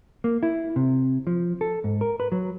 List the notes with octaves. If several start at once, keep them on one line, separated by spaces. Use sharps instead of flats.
A#3
E4
C3
F3
A4
G#2
A#4
B4
F#3